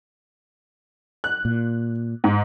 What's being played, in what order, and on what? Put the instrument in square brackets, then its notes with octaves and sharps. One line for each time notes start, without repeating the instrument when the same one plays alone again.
[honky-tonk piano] F#6
[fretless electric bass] A#2
[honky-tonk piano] G#2